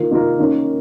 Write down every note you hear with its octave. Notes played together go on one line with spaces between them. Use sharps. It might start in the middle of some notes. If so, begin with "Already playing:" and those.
Already playing: D#3 A#3 F4 A#4
D#3 A#3 F4 A#4
D#3 A#3 C#4